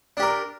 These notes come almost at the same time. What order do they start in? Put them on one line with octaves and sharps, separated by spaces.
D4 G4 A#4